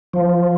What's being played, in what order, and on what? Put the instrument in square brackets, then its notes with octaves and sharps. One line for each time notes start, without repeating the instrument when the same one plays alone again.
[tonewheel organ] F3